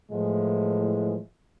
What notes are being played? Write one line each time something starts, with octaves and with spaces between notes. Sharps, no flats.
A2 E3 F3 G#3